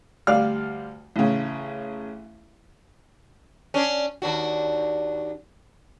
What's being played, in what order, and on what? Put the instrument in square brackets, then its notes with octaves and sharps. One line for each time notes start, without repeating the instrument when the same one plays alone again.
[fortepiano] D2 G3 D5 F5 F6
A1 C#3
[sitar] C#4 D4
D#2 D4 F#4